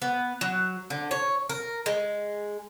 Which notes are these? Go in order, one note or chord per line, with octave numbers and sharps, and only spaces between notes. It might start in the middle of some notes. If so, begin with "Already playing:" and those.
B3
F#3
D3
C#5
A#4
G#3